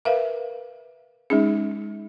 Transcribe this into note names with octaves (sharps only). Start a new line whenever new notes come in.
A#4 B4 E5 F5
G#3 C#4 D#4 G#4